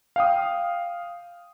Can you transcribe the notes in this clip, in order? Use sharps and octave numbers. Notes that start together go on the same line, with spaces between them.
F5 G5 D#6